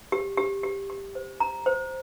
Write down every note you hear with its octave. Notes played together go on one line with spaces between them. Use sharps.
G4
G4
G4
G4
C5
A#5
C5